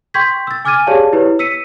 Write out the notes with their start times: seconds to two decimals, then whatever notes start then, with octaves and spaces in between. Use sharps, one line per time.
0.14 G5 C6 C#6 G6 G#6 B6
0.47 E6 A6
0.65 G#5 D6 F6 G#6 A6 D#7
0.87 G4 G#4 C#5 D5 F5 A5
1.13 E4 G4 B4 C#5
1.39 E6 B6 C#7 D#7